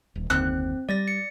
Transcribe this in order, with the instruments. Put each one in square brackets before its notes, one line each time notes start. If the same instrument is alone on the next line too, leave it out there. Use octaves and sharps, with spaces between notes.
[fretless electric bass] D#1
[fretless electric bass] F#1 D#2 D3 [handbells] C4 [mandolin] F#6
[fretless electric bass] G3 [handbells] D5 A6 A#6
[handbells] C#7